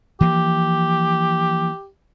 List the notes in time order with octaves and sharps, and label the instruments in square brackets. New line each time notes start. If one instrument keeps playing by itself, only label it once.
[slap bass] E3 F3 A#3 [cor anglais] G4